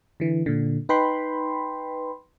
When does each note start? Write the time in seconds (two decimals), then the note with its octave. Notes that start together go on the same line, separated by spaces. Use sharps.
0.20 D3 E3
0.46 A#2 D3
0.89 D#4 B4 G5 B5 C6